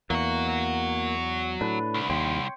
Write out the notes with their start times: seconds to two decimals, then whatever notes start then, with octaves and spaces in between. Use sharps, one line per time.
0.10 E2 F#3 A#3 F#4
1.61 A2 D4 B4
1.94 C2
2.10 D#2 C#5 G5 C6